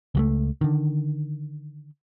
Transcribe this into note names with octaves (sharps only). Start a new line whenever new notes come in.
C#2 F#3 A3
D3 D#3